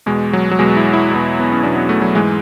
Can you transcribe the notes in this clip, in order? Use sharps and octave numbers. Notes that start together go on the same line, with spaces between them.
E2 B2 G#3
F#3
F#3
E2 B2 G#3
E4
E4
E2 B2
B3
C#4
E2 B2 D4
B3
A3
F#3
G#2 E3 G#3